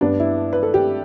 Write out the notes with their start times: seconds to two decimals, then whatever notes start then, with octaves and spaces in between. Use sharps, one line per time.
0.01 G2 G3 B3 D4
0.20 E4
0.53 B4
0.63 A4
0.74 G4